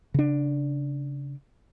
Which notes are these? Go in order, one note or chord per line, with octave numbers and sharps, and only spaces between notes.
C#3 D4